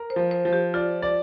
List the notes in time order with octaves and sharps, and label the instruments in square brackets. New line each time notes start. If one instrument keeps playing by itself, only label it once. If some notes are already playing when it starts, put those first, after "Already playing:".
Already playing: [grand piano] A#4
[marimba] C5
[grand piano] F3
[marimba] C5
[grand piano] F3
[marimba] G4
[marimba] F4 [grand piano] D5
[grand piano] D5